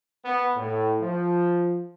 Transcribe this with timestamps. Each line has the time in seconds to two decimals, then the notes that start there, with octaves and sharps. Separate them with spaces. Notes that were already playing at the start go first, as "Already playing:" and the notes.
0.25 B3
0.55 A2
1.02 F3